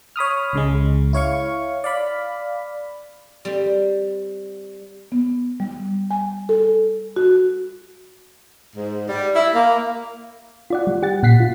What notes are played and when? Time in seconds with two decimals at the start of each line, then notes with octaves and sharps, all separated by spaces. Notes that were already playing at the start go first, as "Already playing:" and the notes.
0.16 C#5 B5 D#6 F6
0.53 C#2 C#3 G#3
1.13 E4 C#5 F5 C#6
1.84 D5 F5 B5
3.45 G3 C4
5.12 B3
5.60 G3
6.11 G#5
6.49 A4
7.16 F#4
8.75 G#2
9.08 G3
9.34 E4
9.54 A#3
10.70 F4 D5 F#5
10.87 G3
11.03 G4 F#5 A6
11.23 A#2 F#5 B6 C7
11.40 F4